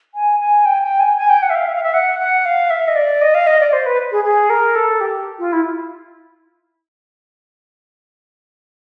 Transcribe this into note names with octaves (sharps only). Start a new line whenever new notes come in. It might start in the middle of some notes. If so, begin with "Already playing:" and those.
G#5
G#5
G5
G5
G#5
G#5
G5
F#5
E5
F5
E5
F5
E5
F#5
F#5
F5
E5
D#5
D5
D#5
F5
D#5
D5
C5
B4
G#4
G#4
A#4
A4
G4
F4
E4